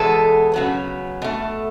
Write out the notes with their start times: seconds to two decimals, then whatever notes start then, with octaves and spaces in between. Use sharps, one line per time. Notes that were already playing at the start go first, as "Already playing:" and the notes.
Already playing: E2 B2 G#3 B3 A4
0.54 C#3 F#3 B3
1.22 B2 A3